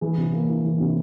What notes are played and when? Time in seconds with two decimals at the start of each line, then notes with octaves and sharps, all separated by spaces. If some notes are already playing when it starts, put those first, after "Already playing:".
0.01 E3 G#4
0.17 C3
0.33 A#3
0.49 E4
0.64 E3
0.80 C3